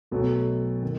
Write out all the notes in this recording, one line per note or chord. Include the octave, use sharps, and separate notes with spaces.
B1 B2 F#3 A3
D#3